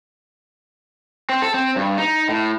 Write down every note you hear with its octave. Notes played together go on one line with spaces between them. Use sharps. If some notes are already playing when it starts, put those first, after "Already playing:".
C4
A4
C4
G2
D#4
A2